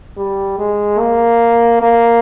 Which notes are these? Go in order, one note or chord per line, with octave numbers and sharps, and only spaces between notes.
G3
G#3
A#3
A#3